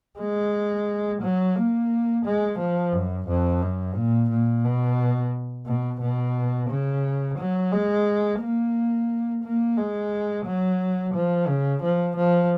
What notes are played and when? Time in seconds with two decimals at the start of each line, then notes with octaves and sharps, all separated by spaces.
0.19 G#3
1.22 F#3
1.56 A#3
2.25 G#3
2.59 F3
2.93 F#2
3.28 F2
3.62 F#2
3.95 A#2
4.31 A#2
4.65 B2
5.66 B2
6.01 B2
6.70 C#3
7.38 F#3
7.72 G#3
8.41 A#3
9.44 A#3
9.77 G#3
10.45 F#3
11.14 F3
11.48 C#3
11.82 F3
12.16 F3